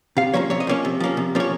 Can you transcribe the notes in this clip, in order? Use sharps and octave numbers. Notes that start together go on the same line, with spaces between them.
C3 F5
F3 A#3 C#4 C#5
C3 C#5
D#5
F3 A#3 C#4 C#5
C3
F3 A#3 C#4
C3
F3 A#3 C#4 C#5